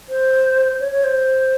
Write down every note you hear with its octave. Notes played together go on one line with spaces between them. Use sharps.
C5
C#5
C#5
C5